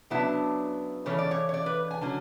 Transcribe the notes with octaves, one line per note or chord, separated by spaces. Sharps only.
C#3 F#3 B3 D4 E4
C#3 E3 A3 C#4 C#5
D5
C#5
C#5
D5
B4
G#5
D3 F#3 C#4